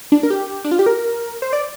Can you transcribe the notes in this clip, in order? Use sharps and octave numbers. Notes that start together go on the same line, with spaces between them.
D4
A#4
G4
D4
F4
G4
A#4
C5
D5